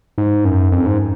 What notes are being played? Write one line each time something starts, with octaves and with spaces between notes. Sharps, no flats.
G#2
F#2
F2
G#2